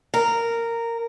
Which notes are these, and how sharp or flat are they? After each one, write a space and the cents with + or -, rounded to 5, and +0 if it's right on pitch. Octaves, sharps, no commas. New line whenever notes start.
A#4 -10